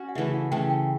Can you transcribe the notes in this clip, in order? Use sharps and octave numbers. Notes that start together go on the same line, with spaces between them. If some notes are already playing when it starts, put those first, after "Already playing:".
Already playing: C#4 F#4
F#5
C#3 E3 A3 E5
F#5
C#3 E3 A3 G5
G5